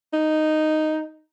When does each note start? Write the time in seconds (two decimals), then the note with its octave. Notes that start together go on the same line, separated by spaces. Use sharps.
0.13 D#4